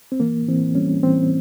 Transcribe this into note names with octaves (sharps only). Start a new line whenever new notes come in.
C4
E3 A#3
E3 C4
G3 C#4
E3 C4